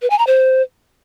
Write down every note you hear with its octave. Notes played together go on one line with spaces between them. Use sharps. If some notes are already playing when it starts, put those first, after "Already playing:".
B4
G#5
A#5
C5